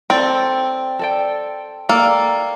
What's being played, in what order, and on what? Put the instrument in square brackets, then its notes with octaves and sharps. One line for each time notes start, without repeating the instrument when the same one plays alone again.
[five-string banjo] C4 [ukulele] A4 D5 G5
[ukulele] A4 D5 G5
[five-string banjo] A#3 [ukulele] A4 D5 G5